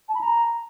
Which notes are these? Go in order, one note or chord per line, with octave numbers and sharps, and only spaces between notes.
A5
B5
A#5